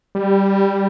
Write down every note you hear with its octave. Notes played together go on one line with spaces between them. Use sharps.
G3